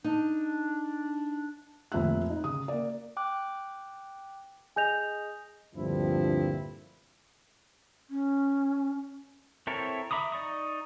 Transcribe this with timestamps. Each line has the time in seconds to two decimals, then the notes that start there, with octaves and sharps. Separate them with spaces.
0.04 D4 D#4
1.92 F1 A#2 E5 F#6
2.30 D#4
2.44 C#3 D#6
2.68 A#3 D5
3.17 G5 D6 F#6
4.76 G#4 D#5 G#5 G6 F7
5.76 D2 G2 A#2 F3 C4 E4
8.10 C#4
9.67 C4 E4 A4 A#4 C#5
10.11 E5 A#5 B5 D6 D#6
10.32 D#4 D5 C#6 D#6